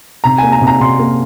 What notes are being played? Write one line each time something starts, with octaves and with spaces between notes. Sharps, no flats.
C3 A#5
A#3 G#5
A#5
C3
A#5
C3 C6
A#3